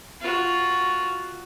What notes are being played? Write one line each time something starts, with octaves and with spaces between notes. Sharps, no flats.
F4 F#4